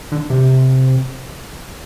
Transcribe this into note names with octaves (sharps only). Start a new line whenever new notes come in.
D3
C3